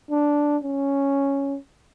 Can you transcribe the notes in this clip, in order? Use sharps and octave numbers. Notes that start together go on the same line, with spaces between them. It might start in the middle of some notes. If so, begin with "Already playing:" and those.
D4
C#4